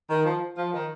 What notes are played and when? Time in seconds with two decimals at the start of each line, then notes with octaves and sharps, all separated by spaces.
0.09 D#3
0.25 F3
0.57 F3
0.73 D#3